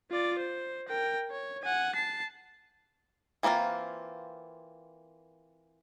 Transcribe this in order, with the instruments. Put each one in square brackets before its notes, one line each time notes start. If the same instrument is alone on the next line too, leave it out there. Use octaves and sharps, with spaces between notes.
[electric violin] F4 D5
C5
A#4 G5
C#5
F#5 G#5
A5 C7
[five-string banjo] E3 A#3 C4 D#4 F4